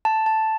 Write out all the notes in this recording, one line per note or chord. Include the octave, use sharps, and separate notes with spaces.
A5
A5